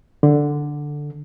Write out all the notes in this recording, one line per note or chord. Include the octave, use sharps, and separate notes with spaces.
D3